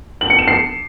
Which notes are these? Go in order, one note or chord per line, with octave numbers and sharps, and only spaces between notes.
F#7
C#7
E7
C7